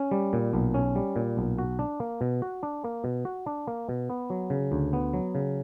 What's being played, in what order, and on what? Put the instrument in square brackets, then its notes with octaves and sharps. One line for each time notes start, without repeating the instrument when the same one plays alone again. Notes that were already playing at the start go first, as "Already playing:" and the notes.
Already playing: [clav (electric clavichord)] C#4
G3
A#2
B1
C#4
G3
A#2
B1
F#4
D4
A#3
B2
F#4
D4
A#3
B2
F#4
D4
A#3
B2
B3
F#3
C#3
D2
B3
F#3
C#3